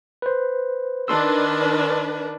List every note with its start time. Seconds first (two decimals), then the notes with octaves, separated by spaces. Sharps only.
0.22 B4 C5
1.08 D#3 D4 B4 A5 C6 E6